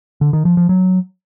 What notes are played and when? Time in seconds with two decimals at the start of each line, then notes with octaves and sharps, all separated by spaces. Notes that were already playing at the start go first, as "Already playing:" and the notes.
0.21 D3
0.33 D#3
0.45 F3
0.57 F3
0.69 F#3